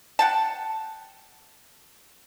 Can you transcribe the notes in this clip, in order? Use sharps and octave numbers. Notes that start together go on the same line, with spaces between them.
F#5 G5 A5